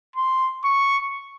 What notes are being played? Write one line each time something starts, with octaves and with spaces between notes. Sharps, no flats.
C6
C#6